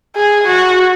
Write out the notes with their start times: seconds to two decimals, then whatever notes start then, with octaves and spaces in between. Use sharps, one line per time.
0.16 G#4
0.47 F#4